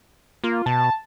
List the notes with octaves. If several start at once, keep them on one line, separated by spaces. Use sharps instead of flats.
A#3 F4
B2 A5